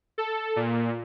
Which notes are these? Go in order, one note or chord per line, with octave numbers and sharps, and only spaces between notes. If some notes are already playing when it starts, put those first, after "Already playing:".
A4
A#2